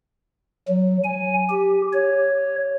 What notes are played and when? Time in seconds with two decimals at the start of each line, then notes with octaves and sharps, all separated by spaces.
0.68 F#3
1.04 G#5
1.49 G4
1.93 C#5